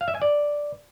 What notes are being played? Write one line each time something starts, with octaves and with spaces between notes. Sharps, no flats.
F5
E5
G#5
D5